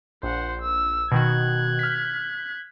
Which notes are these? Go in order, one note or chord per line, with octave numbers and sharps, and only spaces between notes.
A#1 C5 F#5
E6
B2 D#3 F#4 F#6 G#6
F6 B6